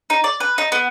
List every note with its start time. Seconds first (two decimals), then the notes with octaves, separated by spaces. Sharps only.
0.10 D#4
0.24 D5
0.40 B4
0.58 D#4
0.72 B3